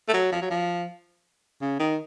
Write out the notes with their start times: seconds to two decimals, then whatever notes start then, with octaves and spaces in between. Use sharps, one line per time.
0.08 A3
0.13 F#3
0.32 F3
0.41 F#3
0.50 F3
1.61 C#3
1.79 D#3